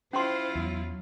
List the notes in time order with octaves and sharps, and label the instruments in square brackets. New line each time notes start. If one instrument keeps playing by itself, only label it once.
[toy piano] C#4 C6 [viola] E4 F4 [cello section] C5
[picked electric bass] E2 [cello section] F#3